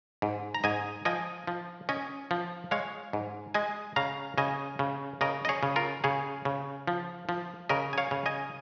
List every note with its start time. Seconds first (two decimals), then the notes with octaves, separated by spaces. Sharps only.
0.22 G#2
0.54 A#5
0.64 G#2 D#5 G#5
1.05 F3 D#5 G#5
1.47 F3
1.89 C#4 D#5 G#5
2.31 F3
2.71 G#3 C#5 F5
3.13 G#2
3.54 G#3 D#5 G#5
3.96 C#3 F5 A#5
4.38 C#3 D#5 G#5
4.79 C#3
5.21 C#3 A#4 D#5
5.45 D#5
5.49 G#4 C#5
5.63 C#3
5.76 F4 A#4
6.04 C#3 G#4 C#5
6.45 C#3
6.87 F3
7.29 F3
7.69 C#3 A#4 D#5
7.93 G#5
7.98 C#5 F5
8.11 C#3
8.26 D#5 G#5